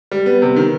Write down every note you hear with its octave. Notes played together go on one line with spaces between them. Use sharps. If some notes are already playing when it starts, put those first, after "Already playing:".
G3
B3
C3
D#3